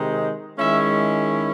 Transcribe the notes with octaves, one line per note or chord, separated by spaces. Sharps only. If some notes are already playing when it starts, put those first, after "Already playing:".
Already playing: C3 D#3 G#3 D#4
D#3 G#3 C#4 E4 E5